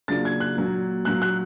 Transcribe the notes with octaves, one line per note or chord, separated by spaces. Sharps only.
C#3 F#3 A#3 D4 F4 A6
G#6
F#6
A#2 F#3 A#3
A#2 F#3 A#3 F#6
F#6